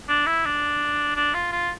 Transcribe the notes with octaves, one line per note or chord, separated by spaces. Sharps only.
D4
E4
D4
D4
F4
F4